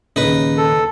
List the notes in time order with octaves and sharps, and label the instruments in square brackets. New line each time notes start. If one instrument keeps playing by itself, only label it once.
[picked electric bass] D#2 A#2 [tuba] C#3 [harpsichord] D#4 B4
[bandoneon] A4